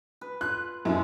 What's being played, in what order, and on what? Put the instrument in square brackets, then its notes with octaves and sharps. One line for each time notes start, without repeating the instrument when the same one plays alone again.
[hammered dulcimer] B4
[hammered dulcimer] F4 [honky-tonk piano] F#6
[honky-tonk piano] F#2 E4 [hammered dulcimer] F3 G#3